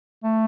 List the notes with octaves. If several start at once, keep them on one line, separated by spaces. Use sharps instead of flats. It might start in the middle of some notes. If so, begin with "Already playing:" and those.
A3